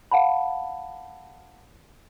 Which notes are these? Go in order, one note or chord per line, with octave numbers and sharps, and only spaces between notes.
F5 F#5 A5 B5